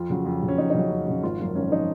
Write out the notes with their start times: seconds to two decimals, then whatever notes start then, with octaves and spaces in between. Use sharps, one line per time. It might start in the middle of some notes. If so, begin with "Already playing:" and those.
Already playing: F2 F4
0.10 C#3 F#3
0.26 F2
0.42 C#3 F#3
0.48 C#4
0.58 F2 D#4
0.70 D#4
0.74 C#3 F#3 C#4
0.91 F2
1.07 C#3 F#3
1.23 G#1 F4
1.39 F#2 F3
1.56 G#1 C#4
1.72 F3 D#4